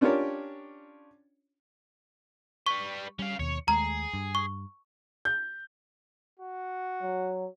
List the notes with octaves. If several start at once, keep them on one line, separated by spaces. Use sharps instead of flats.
C#4 D4 F4 G4 A#4 C#5
G3 B4 C#6
G3 C#4 F5
D#2 B2 C#5
D#2 G#3 A3 G#4 A#5
G2
C#6
G6
F#4
F#3